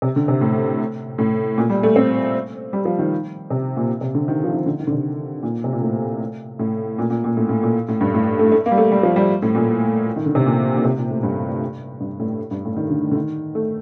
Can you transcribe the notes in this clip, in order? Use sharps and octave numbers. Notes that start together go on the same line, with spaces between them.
C3
D3
C3
A2
A2
A#2
G3
A3
C4
G3
F3
D#3
C3
A#2
C3
D3
D#3
F3
D#3
D3
D#3
D3
C3
A#2
C3
A#2
A2
A2
A#2
A#2
A#2
A2
A2
A#2
A2
G2
A2
A3
A3
A#3
G3
A3
G3
F3
G3
A2
A#2
D#3
D3
C3
A#2
A#2
C3
A#2
A2
G2
G2
A2
G2
A2
D#3
D3
D3
D#3
A3